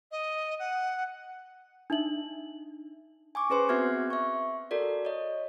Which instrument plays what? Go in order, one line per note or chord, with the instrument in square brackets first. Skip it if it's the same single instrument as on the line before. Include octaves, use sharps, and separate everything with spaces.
[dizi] D#5
F#5
[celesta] D4 D#4 E5 F#7
[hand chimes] G#5 C#6 D6
C#4 G#4 B4 C5 C6
B3 C4 F#4 E5 F6 G#6
E5 C#6
F#4 A4 A#4 D5
C#5 D#5